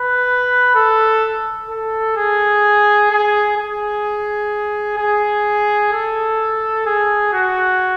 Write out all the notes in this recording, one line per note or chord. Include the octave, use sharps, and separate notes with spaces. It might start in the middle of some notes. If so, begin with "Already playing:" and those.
Already playing: B4
A4
A4
G#4
G#4
G#4
G#4
A4
G#4
F#4